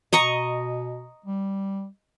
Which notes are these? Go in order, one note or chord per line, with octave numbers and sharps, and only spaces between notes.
B2 D#5 A#5 C#6
G3